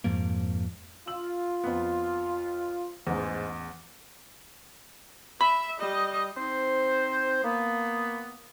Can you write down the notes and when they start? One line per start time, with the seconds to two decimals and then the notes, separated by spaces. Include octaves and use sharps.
0.04 F2 G#2 F3 A#3
1.07 F4 E6 F#7
1.64 F2 B3
3.07 A1 E2 G#2
5.41 E5 B5
5.79 G3 D#5
6.37 C4 D#4 C5
7.44 A#3 B3